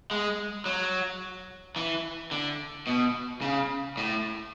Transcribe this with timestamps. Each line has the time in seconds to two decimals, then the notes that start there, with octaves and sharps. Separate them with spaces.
0.11 G#3
0.66 F#3
1.76 E3
2.31 D3
2.87 B2
3.42 C#3
3.97 A2